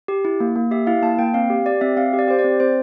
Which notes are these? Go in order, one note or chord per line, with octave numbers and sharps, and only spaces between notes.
G4
E4
A#3
A#3
G4 E5
E4 F5
A#3 A5
A#3 G5
C4 F5
G4
G4 D5
C4 E5
C4 F5
G4
D5
G4 C5
D5
C4
C4 C5